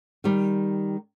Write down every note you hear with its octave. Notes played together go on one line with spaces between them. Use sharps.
D#3 G3